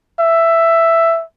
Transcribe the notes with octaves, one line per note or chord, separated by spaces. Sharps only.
E5